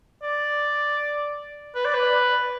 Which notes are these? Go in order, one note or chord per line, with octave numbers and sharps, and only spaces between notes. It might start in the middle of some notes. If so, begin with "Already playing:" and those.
D5
B4
D5
B4